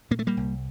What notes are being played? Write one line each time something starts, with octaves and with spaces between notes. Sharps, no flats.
A#2 A#3
A3
G3 A#3
C2